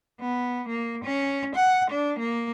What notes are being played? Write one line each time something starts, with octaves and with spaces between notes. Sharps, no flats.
B3
A#3
C#4
F#5
D4
A#3